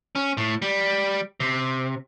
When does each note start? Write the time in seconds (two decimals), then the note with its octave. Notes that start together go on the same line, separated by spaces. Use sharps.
0.15 C#4
0.37 A2
0.62 G3
1.40 C3